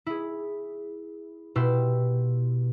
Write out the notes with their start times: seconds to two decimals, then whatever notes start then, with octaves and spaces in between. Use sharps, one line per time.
0.06 E4 G#4
1.56 B2 E4 G4 C6 E6